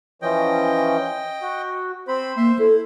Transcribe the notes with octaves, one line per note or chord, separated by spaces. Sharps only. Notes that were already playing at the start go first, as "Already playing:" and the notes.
E3 F3 C#4 D#5 G5
F#4
C4 C5 B5
A#3 E5 C6
E4 A4